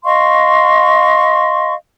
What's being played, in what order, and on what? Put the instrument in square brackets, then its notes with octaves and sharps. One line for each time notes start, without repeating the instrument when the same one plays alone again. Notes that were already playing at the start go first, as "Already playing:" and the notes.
[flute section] D#5 F5 C6 C#6